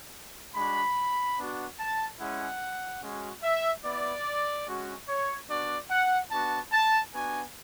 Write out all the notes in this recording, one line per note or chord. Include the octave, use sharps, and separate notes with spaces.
G#3 D4 F#4 B5
B3 D4 F#4
A5
G#3 C#4 E4 F#5
G#3 C#4 F#4
E5
B3 E4 D5
G#3 C#4 F#4
C#5
B3 D4 F#4 D5
F#5
B3 D4 F#4 A5
A5
B3 D4 F#4 G#5